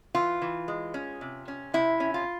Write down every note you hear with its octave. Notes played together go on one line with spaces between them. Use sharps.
E3 F4
E3
G#3
C#4
C3
C#4
C3 E4
C#4
F4